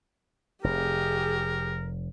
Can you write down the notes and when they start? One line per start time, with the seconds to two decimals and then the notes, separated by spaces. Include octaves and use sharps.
0.64 F1 G4 G#4 A#4